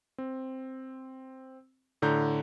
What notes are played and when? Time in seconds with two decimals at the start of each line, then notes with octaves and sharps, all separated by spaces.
0.18 C4
2.02 A2 D3 A#5 G6